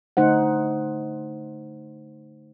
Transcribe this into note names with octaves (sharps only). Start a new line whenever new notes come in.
D3 A3 D#4 C5 F#5